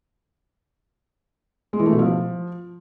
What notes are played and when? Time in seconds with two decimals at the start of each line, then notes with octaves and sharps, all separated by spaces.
1.73 G#3
1.80 E3
1.86 A3
1.92 B2
1.99 F3